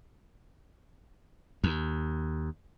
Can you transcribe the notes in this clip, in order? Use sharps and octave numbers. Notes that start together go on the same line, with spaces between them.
D#2